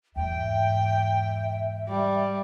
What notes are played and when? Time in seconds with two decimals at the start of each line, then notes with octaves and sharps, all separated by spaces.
0.16 E2 G#2 E5 G5
1.89 G3